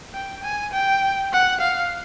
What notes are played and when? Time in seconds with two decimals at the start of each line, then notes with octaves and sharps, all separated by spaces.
0.14 G5
0.43 G#5
0.73 G5
1.33 F#5
1.61 F5